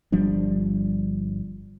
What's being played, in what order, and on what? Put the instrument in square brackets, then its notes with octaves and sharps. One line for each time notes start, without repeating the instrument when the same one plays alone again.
[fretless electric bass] G1 F3 G3 D4